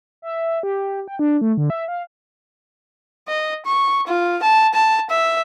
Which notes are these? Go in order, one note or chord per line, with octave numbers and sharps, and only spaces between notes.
E5
G4
G5
D4
A3
D3
E5
F5
D#5
C#6
F4
A5
A5
E5